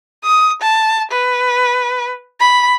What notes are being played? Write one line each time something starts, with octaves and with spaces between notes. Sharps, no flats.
D#6
A5
B4
B5